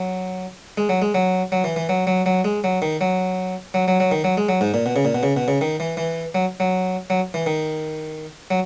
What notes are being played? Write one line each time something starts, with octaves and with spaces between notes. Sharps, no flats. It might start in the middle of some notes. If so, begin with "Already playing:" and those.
Already playing: F#3
G#3
F#3
G#3
F#3
F#3
E3
E3
F#3
F#3
F#3
G#3
F#3
D#3
F#3
F#3
F#3
F#3
D#3
F#3
G#3
F#3
G#2
A#2
B2
C#3
A#2
B2
C#3
B2
C#3
D#3
E3
E3
F#3
F#3
F#3
E3
D#3
F#3